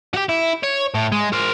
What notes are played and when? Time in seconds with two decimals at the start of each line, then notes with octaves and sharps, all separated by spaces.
0.14 F#4 G4
0.29 E4
0.64 C#5
0.95 A2
1.12 G#3
1.33 A#4 C5